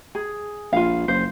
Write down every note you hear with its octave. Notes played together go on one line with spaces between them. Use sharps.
G#4
A#1 F4 F5
F#1 C5